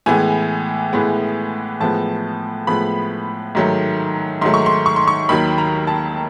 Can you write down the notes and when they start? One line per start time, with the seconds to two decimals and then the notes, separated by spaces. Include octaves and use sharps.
0.06 A2 E3 G#3 B3 G#5
0.93 A2 E3 G#3 B3
1.80 A2 F3 G#3 B3 A5
2.67 A2 F3 G#3 B3 B5
3.55 G#2 D#3 F#3 A3
4.41 G#2 D#3 F#3 A3 C6
4.54 C#6
4.66 C6
4.86 C#6
4.96 C6
5.08 C#6
5.29 D#2 D#3 F#3 B5
5.58 A#5
5.87 A5